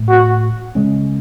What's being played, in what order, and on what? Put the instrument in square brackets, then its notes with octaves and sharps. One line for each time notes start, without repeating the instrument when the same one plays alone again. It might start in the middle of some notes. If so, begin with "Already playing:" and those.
Already playing: [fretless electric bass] A2 A3
[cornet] F#4
[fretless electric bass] C#3 G#3 C#4